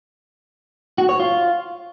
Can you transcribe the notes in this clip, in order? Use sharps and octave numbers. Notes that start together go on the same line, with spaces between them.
F#4
C#5
F4